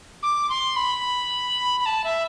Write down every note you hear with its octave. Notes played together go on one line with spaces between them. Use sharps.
D6
C6
B5
B5
A5
E5